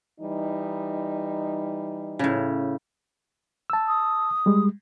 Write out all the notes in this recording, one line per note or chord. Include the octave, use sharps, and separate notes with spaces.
E3 G3 D#4
A2 C#3
A5 E6
D#6
G3 G#3